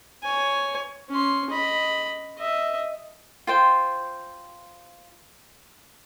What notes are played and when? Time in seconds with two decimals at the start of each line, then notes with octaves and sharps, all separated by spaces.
0.23 C#5 G#5
1.10 C#4 C6
1.50 D#5 B5
2.38 D#5 E5
3.47 F4 C5 G5